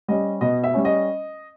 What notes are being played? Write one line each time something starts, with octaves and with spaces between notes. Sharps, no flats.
G3 C#4 D#5
B2 D#5
E5
G3 C#4
D#5